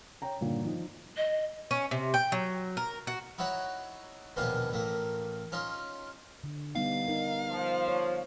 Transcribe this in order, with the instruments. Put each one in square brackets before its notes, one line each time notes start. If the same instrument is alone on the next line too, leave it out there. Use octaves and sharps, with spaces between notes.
[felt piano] C#5 G5 A#5
G2 A#2 D3 D#3 A#3
D#3 F3 D#4
[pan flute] D#5
[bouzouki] C#4
C3
G5
F#3
A#4
F#4
[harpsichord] D#4 E4 F#4 C#5 F#5
A#1 D#2 B2 D4 F5 G#5
A1 A3 A#3
C#4 D#4 F4
[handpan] D3
[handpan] G3 B3 D#4 [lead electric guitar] F5
[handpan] D#4 A#4
[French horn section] F3
[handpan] C#5